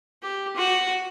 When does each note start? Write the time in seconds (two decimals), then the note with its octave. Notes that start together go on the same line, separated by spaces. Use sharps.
0.22 G4
0.56 F#4